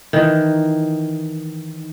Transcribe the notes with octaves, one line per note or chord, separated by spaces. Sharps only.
D#3 E3 D#4